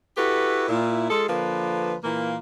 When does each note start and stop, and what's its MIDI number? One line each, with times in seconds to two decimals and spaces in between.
0.17 0.68 64
0.17 0.68 66
0.17 0.68 67
0.17 0.68 69
0.17 0.68 71
0.69 1.08 46
0.69 1.08 64
1.10 1.24 56
1.10 1.24 65
1.10 1.24 68
1.10 1.24 69
1.29 1.95 50
1.29 1.95 53
1.29 1.95 58
1.29 1.95 71
2.02 2.36 46
2.02 2.36 52
2.02 2.36 58